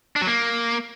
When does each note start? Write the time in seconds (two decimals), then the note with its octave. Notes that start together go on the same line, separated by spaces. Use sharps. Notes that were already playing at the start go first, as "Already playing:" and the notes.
0.16 D4
0.22 F#3
0.27 A#3